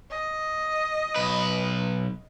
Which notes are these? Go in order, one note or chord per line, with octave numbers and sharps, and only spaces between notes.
D#5
B1 B4